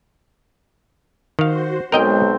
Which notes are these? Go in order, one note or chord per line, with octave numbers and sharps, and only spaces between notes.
D#3 F#4 C5 F5
B1 G#3 C4 A#4 D#5 G5